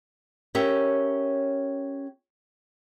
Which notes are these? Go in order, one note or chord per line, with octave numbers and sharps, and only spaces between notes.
C#4 G4 A#4 C#5 E5